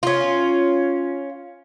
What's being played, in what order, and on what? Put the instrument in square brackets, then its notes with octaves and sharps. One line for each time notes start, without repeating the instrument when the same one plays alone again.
[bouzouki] C#4 F4